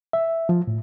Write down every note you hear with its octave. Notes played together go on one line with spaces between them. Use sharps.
E5
F3
A2